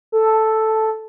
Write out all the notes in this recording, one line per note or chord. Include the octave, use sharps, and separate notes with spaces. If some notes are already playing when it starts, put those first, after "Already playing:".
A4